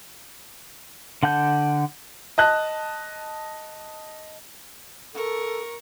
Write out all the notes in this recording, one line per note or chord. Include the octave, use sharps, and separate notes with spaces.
D3 F#5 A5 G6
D#5 A5 F#6
A4 A#4 C#6